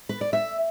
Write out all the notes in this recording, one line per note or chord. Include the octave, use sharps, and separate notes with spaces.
B4
D5
E5